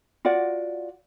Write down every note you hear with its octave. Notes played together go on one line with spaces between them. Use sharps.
F4 F#4 D5 F#5